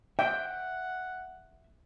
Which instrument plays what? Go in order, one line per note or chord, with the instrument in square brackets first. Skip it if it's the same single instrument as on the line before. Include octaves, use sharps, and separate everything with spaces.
[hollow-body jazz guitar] E5 [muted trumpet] F#5 [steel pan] G5